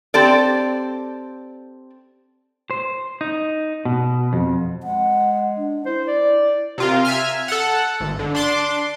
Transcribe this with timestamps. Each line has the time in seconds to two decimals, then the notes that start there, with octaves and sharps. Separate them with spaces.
0.14 C4 G4 A4 D5
2.71 C5
3.21 D#4
3.85 B2
4.33 F2
4.83 G#3 F#5
5.58 D4
5.86 E4 C5
6.08 D5
6.78 C3 F4 A#4
7.05 E5 G#5 F6
7.48 A4 F#5
8.00 G#1
8.19 D3
8.35 D4 C6 D6